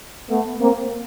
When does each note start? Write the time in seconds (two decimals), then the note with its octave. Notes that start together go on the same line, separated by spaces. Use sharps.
0.30 A3 B3
0.60 A#3 C4